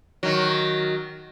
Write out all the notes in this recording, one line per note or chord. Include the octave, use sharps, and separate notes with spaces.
D#3 F#3